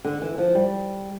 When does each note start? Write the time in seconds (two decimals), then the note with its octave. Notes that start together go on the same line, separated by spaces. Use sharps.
0.04 D3
0.22 E3
0.38 F3
0.55 G3